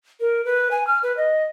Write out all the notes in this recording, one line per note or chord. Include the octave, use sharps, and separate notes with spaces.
A#4
B4
G#5
F6
B4
D#5